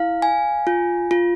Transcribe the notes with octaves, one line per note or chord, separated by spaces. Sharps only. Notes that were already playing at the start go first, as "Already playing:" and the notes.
Already playing: E4 F5
G#5
F4
F4